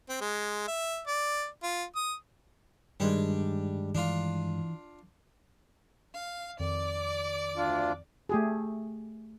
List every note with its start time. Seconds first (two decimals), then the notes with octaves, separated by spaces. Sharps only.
0.09 C4
0.21 G#3
0.68 E5
1.07 D5
1.63 F4
1.95 D#6
3.00 G2 D#3 G3 G#3 D4
3.95 E3 D4 F4
6.14 F5
6.59 F2 D#3 D5 D6
7.57 D2 D4 F4
8.29 A3 G4 G#4